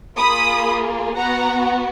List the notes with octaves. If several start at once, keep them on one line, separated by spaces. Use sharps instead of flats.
A#3 F4 G#4 B5 D#6
B3 F#4 F#5 A#5